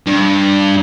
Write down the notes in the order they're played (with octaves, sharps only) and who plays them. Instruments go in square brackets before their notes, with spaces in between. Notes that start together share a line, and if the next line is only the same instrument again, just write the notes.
[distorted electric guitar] G2